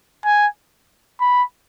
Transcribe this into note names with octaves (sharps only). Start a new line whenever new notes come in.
G#5
B5